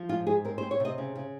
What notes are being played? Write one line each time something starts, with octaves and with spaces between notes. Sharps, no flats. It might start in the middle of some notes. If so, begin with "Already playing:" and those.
Already playing: F3
G#2 F4
G#2 G#4
C4 A#4
C5
C4
C#5
C3 D#5
C#3
C#3